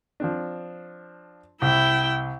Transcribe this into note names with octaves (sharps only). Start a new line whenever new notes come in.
F3 C4 D4
C2 E4 G5